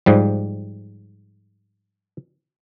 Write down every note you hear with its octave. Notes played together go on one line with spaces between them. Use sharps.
G#2 F3 G3